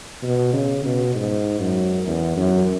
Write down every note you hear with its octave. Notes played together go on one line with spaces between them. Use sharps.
B2
C#3
B2
G#2
F#2
E2
F#2